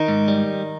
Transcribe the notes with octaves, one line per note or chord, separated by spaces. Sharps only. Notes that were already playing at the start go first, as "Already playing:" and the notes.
Already playing: D#3 D#4
G#2
G3